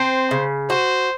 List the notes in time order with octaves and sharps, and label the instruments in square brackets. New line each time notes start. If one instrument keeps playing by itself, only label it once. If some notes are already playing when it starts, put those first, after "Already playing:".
Already playing: [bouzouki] C4 [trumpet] C5
[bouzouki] C#3
[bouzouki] F#4 [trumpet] C5